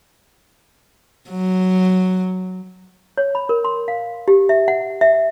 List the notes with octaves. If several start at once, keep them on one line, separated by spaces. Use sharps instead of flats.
F#3
C#5
B5
A#4
C6
F5
G4
E5
F#5
E5
E5